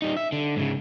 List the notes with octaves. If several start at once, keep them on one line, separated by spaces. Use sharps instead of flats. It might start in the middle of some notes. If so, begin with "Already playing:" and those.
G3 D#4
E5
D3
G#2 C#3